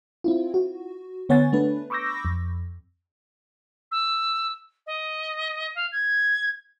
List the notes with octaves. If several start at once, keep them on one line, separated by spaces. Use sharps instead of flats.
C4 E4 F4
F#4
D3 B3 C#5 F#5 G#5 A6
A3 D4 B4
B5 C#6 D6 E6 G6 A#6
F2
E6
D#5
F5
G#6